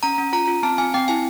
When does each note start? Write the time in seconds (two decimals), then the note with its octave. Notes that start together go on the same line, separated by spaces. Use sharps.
0.03 C#4 A#5
0.18 C#4
0.33 F4 A#5
0.48 F4
0.63 C4 A5
0.78 C4 G#5
0.94 C4 G5
1.08 E4 G#5